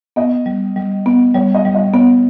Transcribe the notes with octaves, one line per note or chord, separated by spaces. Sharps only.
B3 D#5
G3
G3
B3
G3 C#5
D#5
G3
D#5
B3 C#5